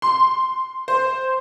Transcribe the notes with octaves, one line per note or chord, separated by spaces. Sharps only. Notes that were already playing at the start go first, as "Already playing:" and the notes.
C6
C5